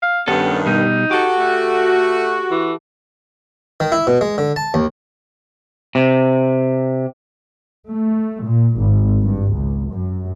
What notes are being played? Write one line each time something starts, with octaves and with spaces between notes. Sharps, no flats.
F5
G2 D#3 B3 C#4 A4
B2 G3 D#4
F#4 G4 A4
A3
E3
D#3
E4
B2
G#3
D3
A5
D#2
C3
A3
A#2
G#1
G2
C#2
F#2